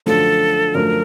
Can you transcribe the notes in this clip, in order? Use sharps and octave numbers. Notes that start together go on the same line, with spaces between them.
F#2 D3 F3 A3 A4
F#2 D3 F3 A3 A#4